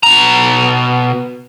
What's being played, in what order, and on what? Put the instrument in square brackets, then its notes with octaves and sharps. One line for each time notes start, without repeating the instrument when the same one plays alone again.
[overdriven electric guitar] B2 A#5